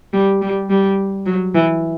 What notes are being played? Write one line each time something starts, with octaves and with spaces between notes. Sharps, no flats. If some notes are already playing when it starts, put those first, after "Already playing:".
G3
G3
G3
F#3
E3